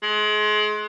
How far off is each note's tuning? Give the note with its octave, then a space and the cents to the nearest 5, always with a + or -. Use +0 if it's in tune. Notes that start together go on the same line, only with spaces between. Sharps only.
G#3 +30